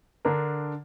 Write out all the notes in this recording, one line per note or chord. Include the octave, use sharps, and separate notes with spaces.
D3 D4 A#4